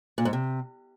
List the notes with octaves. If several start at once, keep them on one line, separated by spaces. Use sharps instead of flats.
A#2
G#2
C3